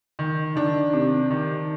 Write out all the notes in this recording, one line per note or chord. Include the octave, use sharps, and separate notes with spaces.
D#3
D#3 D4
C3
D#3